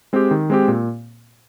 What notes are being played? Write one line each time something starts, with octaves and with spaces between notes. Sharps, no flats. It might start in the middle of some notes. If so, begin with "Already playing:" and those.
G#3 C4 G4
D#3
G#3 C4 G4
A#2